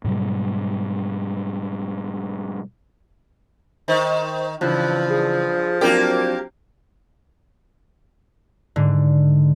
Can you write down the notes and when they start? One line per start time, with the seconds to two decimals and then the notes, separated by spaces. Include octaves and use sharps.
0.04 G#2 B2 F#3 G3
3.88 D#3 C5
4.61 G2 C#3 E3 F3 F#6
5.09 G#4
5.81 F#3 A#3 C4 D4 G4 A#4
8.76 G#2 D3